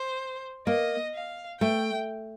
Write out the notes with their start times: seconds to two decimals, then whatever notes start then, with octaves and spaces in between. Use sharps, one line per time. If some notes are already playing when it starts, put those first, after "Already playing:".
Already playing: C5
0.67 A#3 D#5
1.15 F5
1.61 A3 G5